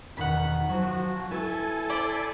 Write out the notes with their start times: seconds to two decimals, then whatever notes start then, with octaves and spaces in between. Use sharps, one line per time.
0.17 E2 B2 D#3 F#5 B5
0.69 F3 F#3 F#4
1.31 E4 A4 B4 G#5 A5
1.90 C5 D5 B5